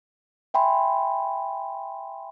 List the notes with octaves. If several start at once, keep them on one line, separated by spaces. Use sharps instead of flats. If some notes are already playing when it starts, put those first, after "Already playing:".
E5 G5 G#5 B5 C6